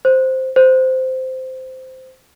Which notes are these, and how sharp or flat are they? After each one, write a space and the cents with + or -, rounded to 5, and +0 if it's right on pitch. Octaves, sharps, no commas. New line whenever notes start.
C5 +0
C5 -10